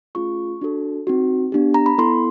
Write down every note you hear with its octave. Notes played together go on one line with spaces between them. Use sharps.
A3 C#4 F4 G#4 C#6
D4 F#4 A4
C4 D#4 F#4
B3 D4 G4
A#5
B5
B3 E4 A4 C6